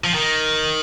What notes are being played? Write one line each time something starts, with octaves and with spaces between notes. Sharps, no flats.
F3
D#3